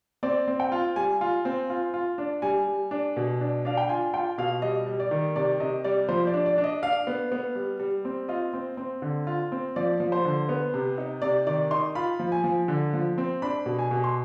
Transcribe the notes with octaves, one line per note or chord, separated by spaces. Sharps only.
C4 D5
C4
G5
F4
G3 G#5
F4
C4
F4
F4
D4
G3 G#5
G3
D4
B2
D4
D4 F5
G5
F4 G#5
F4 G5
B2 F5
G3 D#5
G3
D5
D#3
C3 D5
C3 D#5
G3 D5
F3 C5
D5
D4
D5
D4
D#5
D4 F5
B3
B3
G3
G3
C4
F4 D#5
C4
C4
D3
F4
C4
F3 D5
F3
C5
D3
B3
C3
D#4
C3 D5
D#3 D5
D#4 C6
F4 B5
F3
G#5
F3
D3
F3
C4
D4 B5
B2
G#5
B2
C6